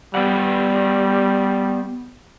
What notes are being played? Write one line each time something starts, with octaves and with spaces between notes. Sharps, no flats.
G3 B3 D5 F#5